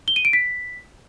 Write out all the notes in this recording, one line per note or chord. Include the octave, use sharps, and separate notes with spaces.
G7
D#7
D7
B6